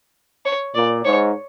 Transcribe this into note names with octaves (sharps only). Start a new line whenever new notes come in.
C#5
A#2 D5
G#2 C#5